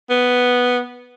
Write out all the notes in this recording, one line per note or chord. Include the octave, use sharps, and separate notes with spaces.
B3